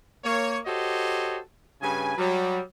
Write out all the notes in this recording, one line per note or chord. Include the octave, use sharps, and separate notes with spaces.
A#3 C#5
F#4 G4 A4 C5 C#5 D#5
G2 C#3 B4 G#5
F#3 G3